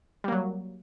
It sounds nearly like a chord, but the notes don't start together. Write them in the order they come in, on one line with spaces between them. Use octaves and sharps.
G3 A#3 F#3